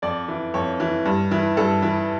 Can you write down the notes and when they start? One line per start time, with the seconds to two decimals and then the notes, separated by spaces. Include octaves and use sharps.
0.02 F2 D5
0.28 E3
0.54 F2 C#5
0.80 E3
1.05 G2
1.31 E3
1.57 G2 A4
1.82 E3